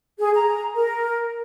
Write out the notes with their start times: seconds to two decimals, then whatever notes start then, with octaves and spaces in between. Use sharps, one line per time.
0.18 G#4
0.33 A#5
0.75 A#4